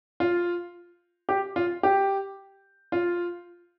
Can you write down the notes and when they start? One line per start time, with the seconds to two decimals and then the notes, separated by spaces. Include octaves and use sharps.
0.20 F4
1.29 G4
1.56 F4
1.83 G4
2.92 F4